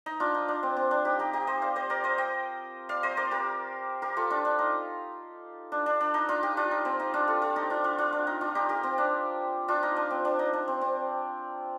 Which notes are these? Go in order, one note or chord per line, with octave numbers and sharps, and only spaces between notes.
D#4
D4 F4
D#4
D4
C4
C4
D4
D#4 G4
D#4 G4
D#4 G4
C5 D#5
D5 F5
C5 D#5
A#4 D5
C5 D#5
D#5 G5
D5 F5
C5 D#5
A#4 D5
G4 A#4
G4 A#4
F4 A4
D4 F4
D4
D#4
D4
D4
D4
D#4
D4 F4
D#4 G4
D4 F4
D#4
C4
D#4
D4 F4
F4 A4
F4 A4
D#4 G4
D4 F4
D4 F4
D4 F4
D4
D#4
D4 F4
D#4 G4
G4 A#4
C4
D4
D4 F4
D#4
D4
C4
D4
D#4
D4
C4
C4